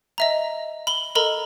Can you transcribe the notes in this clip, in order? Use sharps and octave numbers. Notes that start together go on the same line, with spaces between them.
D#5 E5 A#5
B5 G7
A4 A#4 D#5 A#5 B5